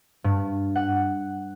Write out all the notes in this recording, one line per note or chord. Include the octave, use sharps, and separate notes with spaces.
G2
F#5